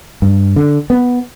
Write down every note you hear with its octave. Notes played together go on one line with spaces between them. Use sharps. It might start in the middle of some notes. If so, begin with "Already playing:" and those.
G2
D3
B3